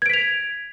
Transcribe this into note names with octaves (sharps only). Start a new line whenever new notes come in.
G#6 B6 D7 F7